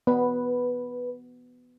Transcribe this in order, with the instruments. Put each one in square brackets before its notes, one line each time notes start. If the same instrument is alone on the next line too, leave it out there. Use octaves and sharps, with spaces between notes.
[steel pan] B3 [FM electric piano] B4